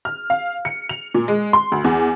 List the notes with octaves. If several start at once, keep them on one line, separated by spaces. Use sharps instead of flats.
F6
F5
C#7
F7
A#2
G#3
C6
D2
E2